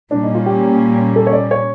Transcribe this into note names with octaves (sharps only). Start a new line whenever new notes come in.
A#2 G3 A#3 C#4 D4
D#4
F4
G4
A4
C#5
D5
C#5